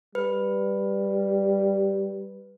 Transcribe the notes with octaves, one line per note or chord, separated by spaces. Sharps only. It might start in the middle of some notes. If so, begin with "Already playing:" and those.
G3 B4